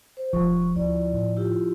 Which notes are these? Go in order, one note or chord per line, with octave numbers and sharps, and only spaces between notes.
C5
E1 F3 C#6
D2 E4 D5
A2
E4 F4 G4